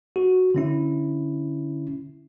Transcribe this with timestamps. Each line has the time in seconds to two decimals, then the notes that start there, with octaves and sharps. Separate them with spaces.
0.16 F#4
0.55 D3 C#4 E4